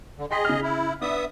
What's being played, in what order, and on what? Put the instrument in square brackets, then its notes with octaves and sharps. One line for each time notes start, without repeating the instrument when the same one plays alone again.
[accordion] D3
[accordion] G#4 D#5 [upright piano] G5 C6 B6
[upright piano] C#3 F6
[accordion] E4
[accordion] B3 E5 D#6 [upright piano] D4